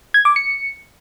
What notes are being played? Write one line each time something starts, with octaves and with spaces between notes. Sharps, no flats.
G#6
D6
C#7